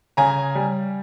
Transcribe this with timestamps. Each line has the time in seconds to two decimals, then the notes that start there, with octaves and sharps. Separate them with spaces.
0.17 C#3 G#5 A#5
0.55 G3